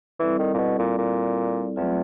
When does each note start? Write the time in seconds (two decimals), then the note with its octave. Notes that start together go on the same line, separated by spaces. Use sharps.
0.19 E3 G3 C4 E4 A4 D5
0.39 D#3
0.54 A#2
0.58 B2
0.79 A#2
0.98 A#2
1.76 E2 F#3 A3 C4 F4